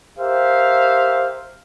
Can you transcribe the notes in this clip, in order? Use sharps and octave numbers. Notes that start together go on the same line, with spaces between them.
G4 A#4 C5 E5 F5